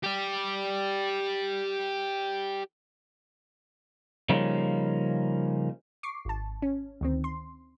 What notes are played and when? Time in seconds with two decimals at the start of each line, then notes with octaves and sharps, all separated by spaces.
0.04 G4 D5
4.29 C#3 F3 G3 A#3 C#4 D#4
6.03 C#6 D6 C7
6.25 G#1 A5
6.62 C#4
7.01 D2 D#3 C4
7.24 C6